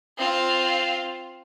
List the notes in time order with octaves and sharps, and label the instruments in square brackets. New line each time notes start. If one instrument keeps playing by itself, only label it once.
[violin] C4 F4